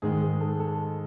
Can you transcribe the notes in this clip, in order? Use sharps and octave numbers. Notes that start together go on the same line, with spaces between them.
G#2 D#3 G#3 G#4
G#4
A4
A4